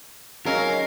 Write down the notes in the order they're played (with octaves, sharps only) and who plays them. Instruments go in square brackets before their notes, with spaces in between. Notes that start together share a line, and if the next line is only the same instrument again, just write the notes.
[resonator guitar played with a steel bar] F#3 C#4 [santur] G#3 D#4 [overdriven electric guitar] A#4 [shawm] F5